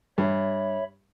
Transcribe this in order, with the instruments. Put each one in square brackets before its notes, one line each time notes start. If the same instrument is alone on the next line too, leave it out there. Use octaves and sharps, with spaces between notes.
[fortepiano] G2 [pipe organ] C#5 E5 B5